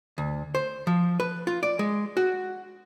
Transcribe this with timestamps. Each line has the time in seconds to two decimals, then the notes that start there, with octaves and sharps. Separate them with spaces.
0.18 D2
0.55 C5
0.87 F3
1.20 B4
1.47 F4
1.63 D5
1.79 G#3
2.17 F#4